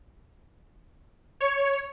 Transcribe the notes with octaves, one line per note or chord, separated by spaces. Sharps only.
C#5